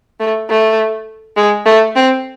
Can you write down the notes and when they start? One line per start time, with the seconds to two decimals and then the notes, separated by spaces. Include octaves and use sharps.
0.20 A3
0.50 A3
1.37 G#3
1.66 A3
1.96 C4